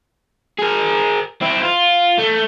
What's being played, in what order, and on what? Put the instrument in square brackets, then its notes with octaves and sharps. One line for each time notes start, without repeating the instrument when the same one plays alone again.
[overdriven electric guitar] G#4 A#4
C4 E4
F4
A3